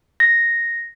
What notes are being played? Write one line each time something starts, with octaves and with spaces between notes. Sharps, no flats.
A#6